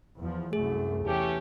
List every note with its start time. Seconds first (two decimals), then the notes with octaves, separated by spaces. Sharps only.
0.18 E2 F3
0.53 C2 F#2 A3 G#4
1.05 E2 A3 C#4 G4